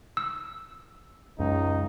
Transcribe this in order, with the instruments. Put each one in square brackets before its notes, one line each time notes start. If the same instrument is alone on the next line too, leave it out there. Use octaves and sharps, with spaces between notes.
[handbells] E6
[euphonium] C#2 [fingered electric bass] F#2 [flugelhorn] D#4